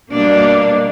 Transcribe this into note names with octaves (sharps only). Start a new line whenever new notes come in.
B2 G3 A#3 D4